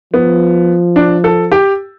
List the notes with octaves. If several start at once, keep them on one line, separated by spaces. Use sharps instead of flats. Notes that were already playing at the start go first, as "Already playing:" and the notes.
F3 B3
D4
A4
G4